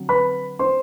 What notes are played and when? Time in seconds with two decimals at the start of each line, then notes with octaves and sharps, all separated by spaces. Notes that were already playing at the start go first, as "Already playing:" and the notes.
Already playing: D3 F#3 C4
0.09 B4 B5
0.59 C5 C6